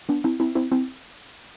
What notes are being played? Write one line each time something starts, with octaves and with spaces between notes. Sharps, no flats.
B3 D4
C4 E4
C4 E4
C4 E4
C4 E4